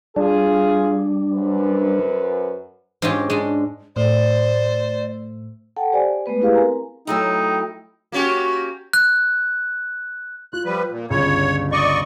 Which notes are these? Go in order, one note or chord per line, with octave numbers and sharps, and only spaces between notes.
G3 D4 F4 G#4
F#2 B4 C5
G#2 G#3 C#4 F4 G4
G#3 D4
A2 A3 C5 D5
A4 F#5 G5 A5
G4 C5 D5 G#5
G#3 A3 B3 B4
E4 G4 G#4 B4 F5
C4 A#4 G#5 A#5
F#3 A3 D#4 E4 G5
A#3 C#4 F#4 G4
F#6
F4 F#6
F3 G3 B4
A#2
G1 C#2 C#5
D5 D#5 C#6